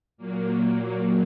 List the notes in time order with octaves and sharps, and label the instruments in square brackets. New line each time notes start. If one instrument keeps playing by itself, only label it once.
[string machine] A#2 F#3 A#3